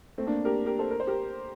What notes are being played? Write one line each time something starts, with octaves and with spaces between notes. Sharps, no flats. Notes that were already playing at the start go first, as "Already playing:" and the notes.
A3 C4
A#3 D4
G4 A#4
G4 A#4
A4 C5
A#4
C5
G4 A#4